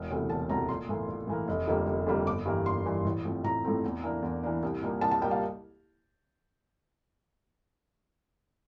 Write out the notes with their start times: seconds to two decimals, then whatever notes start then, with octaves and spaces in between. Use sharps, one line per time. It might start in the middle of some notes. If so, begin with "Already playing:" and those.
Already playing: E1
0.11 D2 C3 E3 A3
0.29 E1 A5
0.49 D2 C3 E3 A3 A#5
0.68 A#1 C6
0.89 A2 E3 A#3
1.08 A#1
1.27 A2 E3 A#3
1.48 F1
1.67 F2 D3 G3 A#3
1.87 F1
2.07 F2 D3 G3 A#3
2.26 G1 D6
2.45 G2 E3 G3 A#3
2.65 G1 C6
2.86 G2 E3 G3 A#3
3.05 A1
3.25 A2 F3 A3 C4
3.44 A1 A#5
3.65 A2 F3 A3 C4
3.84 E2
4.03 E3 A#3 D4
4.22 E2
4.43 E3 A#3 D4
4.63 C2
4.82 A#2 G3 A#3
5.01 C2 A5
5.11 A5
5.22 A#2 G3 A#3 G5
5.31 F5